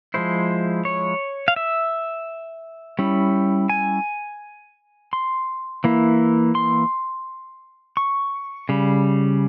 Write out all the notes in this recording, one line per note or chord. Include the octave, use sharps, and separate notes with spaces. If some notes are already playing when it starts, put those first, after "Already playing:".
F3 G#3 E4 C5
C#5
F5
E5
G3 C#4 E4
G#5
C6
E3 A#3 E4
C6
C#6
C#3 G3